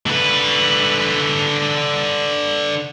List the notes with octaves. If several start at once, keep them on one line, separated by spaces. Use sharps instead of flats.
D3 B4